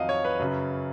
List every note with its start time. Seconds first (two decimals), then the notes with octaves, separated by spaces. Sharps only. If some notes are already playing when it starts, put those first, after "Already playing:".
Already playing: F2 D#3 F#3 D#5 F5 F#5
0.09 C#5
0.25 B4
0.39 F#2 C#3 F#3